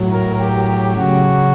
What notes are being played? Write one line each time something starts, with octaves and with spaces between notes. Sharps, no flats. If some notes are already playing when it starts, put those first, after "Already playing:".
Already playing: A2 F#3
A#4
G4
G4
C#3 F#3 F#4